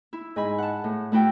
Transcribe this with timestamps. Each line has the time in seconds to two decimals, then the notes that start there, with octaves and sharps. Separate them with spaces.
0.13 E4
0.36 G#2 G#5 B5
0.58 F#5 A5
0.84 A2
1.12 A3 E4 F#4 G5